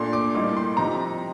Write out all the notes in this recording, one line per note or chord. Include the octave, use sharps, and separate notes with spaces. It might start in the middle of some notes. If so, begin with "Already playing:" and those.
Already playing: A#2 A3 D4 C6
D6
A2 G3 A#3 D#4 D6
C6
C3 F3 C4 D#4 A#5